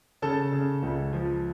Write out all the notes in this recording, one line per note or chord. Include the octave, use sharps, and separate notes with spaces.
C#3 A4 A5
C#3
C#2
F3